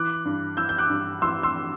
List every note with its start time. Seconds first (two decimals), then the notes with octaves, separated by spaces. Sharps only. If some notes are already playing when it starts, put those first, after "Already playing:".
Already playing: E3 D6 F#6
0.25 G2
0.57 E3 E6 G6
0.69 G6
0.78 D6 F#6
0.90 G2
1.22 E3 C6 E6
1.43 C6 E6